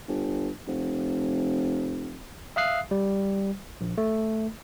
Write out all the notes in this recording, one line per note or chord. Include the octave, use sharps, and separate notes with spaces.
G1
F1
E5 F5 D#6 F#6 C7
G3
A#1
A3